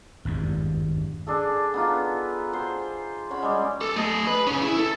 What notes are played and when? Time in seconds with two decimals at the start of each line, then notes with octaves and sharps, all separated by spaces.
0.25 G#1 E2 G2
1.27 D4 G#4 A4
1.74 B3 D#4 F4
2.52 G#4 C5
3.31 C#4 C#5 F#5 B5
3.43 G3 G#3
3.81 A4
3.96 A3 D#5
4.27 B4
4.47 C#4 G#4
4.62 E4
4.77 A4